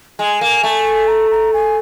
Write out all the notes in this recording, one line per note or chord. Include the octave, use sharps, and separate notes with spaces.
G#3 G#5
A#3
A3
A#5
A#5
G#5